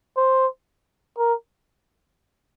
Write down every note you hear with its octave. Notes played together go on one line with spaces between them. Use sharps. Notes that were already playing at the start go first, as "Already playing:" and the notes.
C5
A#4